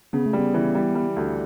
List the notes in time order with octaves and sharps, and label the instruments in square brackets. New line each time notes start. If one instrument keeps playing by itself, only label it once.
[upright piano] C#3 [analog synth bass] B3
[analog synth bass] A3
[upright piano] G3
[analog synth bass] B3
[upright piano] E3
G3
G3
D2